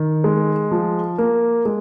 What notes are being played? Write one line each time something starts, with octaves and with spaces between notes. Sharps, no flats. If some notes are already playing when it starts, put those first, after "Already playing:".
Already playing: D#3
G#3
F3
A#3
G#3